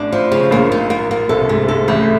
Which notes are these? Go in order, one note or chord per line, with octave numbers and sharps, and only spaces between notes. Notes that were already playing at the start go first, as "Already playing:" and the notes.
Already playing: A1 A2 D4
F3
C#3
A#1 A#2 A#3
D#4
A#3
A#3
C2 C3 A4
G#2 A3
G#2 A4
A1 A2 A3